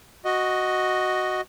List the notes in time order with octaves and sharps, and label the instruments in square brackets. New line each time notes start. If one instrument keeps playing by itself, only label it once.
[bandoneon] F#4 D#5